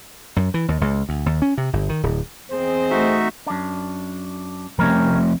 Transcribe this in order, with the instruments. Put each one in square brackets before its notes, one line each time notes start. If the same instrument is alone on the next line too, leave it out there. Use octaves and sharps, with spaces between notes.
[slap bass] F#2
E3
D#2
C#2
D2
D#2
C#4
C3
G1
D#3
D1
[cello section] E2 C4 D#5 [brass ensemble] G#4 C5
[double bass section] A3 [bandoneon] D#4 F#4 E5
[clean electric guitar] F#2 D4
[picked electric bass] F3 A3 C4 [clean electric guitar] G3 C#4 A#4